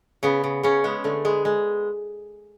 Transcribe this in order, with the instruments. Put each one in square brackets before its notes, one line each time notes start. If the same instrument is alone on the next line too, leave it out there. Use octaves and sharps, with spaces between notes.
[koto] C#3 B3
C#3
C#3 C#4
G#3 B3
D3 A3
G#3 B3
G#3